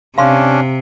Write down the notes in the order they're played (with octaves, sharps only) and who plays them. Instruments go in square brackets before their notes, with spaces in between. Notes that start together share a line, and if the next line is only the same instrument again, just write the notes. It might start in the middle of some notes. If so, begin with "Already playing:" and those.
[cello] C3 [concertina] C#4 D4 [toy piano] F5 C6